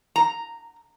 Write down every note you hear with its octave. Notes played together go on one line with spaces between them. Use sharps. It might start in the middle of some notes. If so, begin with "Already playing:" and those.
A#5